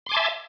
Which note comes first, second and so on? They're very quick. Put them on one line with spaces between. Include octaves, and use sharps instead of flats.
C6 D6 G#5 A5 E5